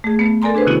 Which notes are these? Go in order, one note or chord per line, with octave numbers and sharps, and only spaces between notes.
A3 G#4
A3 B3
A4 A#4 D5 G#5 A#5 C6
D4 G#4 B4 C5
C3 D#3 B3 C#4 E4 F#4